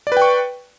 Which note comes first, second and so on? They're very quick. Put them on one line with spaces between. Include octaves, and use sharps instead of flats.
D5 B4 G5 C#6